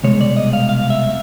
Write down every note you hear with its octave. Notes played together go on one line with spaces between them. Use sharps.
C2 B2 G#3 C#5
D5
D#5
F5
F5
E5